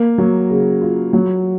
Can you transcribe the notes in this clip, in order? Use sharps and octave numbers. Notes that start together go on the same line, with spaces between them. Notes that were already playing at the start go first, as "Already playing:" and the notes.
Already playing: A#3
F#3
C#3
F4
F#3